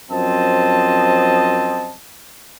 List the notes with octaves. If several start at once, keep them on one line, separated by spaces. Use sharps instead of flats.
F#2 F3 C4 D#5 A5